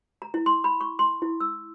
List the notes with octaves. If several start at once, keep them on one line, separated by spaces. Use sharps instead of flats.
A#5
E4
C6
B5
C#6
C6
E4
E6